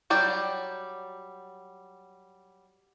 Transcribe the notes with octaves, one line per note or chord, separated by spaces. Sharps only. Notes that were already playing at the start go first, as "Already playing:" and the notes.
F#3 G3 D5 G5